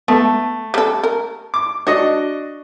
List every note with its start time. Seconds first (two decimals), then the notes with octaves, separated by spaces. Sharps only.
0.08 A3 B3
0.74 G3 A4
1.03 A#4
1.54 D6
1.87 D4 F#4 C#5 D#5